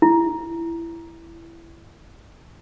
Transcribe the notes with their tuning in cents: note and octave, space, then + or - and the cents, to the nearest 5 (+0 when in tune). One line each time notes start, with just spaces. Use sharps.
E4 +15